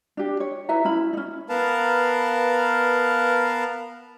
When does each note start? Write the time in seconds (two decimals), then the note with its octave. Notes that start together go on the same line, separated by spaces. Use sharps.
0.17 D4 G4
0.40 C#5
0.69 E4 B4 E5 A#5
0.85 C#4 E4 B5
1.13 C#4 D#4
1.49 B3 A#4 B4 F5 A5